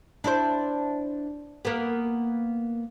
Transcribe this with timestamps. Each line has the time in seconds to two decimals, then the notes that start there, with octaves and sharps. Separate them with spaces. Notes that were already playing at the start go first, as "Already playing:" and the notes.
0.24 D4 E4 C5
1.65 A#3 B3